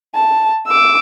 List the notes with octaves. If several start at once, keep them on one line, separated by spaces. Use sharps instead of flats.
A5
D6 E6